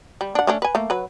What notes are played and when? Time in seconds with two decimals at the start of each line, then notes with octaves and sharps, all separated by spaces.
0.21 G3
0.35 D4 F#5
0.47 A3 C#4 D4
0.62 B4 G#5
0.75 A3 A#3
0.90 F#3 B4